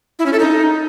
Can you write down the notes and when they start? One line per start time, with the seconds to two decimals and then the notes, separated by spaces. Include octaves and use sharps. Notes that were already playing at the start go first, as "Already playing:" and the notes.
0.19 E4
0.26 C#4
0.33 A4
0.40 D#4